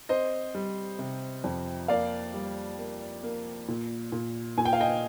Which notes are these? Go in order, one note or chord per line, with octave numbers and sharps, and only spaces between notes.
C4 C5 D#5
G3
C3
F2
A#3 D5 F5
G3
A#3
A#3
A#2
A#2
A#2 G#5
G5
F5
D#5 G5